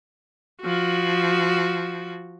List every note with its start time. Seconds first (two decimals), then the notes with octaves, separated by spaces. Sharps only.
0.62 F3 F#4